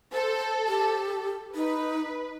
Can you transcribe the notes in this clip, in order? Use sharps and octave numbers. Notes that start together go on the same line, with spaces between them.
A4 C5
G4
D#4 B4